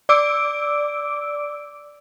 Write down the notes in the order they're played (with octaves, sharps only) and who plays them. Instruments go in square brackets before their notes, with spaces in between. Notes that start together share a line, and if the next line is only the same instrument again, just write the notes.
[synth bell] D5 D6 E6 D7